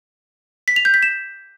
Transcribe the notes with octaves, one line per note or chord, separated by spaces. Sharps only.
B6
F7
G6
B6
E7